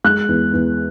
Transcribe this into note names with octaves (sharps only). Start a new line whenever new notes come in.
G#3 F#6
E2
E2